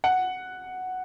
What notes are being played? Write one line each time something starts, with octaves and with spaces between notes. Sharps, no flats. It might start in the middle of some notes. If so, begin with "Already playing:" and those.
F#5